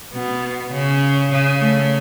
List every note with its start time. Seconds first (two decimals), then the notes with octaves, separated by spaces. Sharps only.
0.14 B2 B3
0.72 C#3 C#4
1.32 C#3
1.60 A3